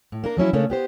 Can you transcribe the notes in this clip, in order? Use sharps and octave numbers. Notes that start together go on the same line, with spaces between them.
A2
A#3 D4 A#4
F3 F#3 C#4 E4
C#3 A3 A#3 C#4 D4
B3 G4 C5